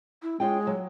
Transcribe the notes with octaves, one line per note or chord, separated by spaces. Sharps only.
E4
G#3 C#4 F4 G5
F#3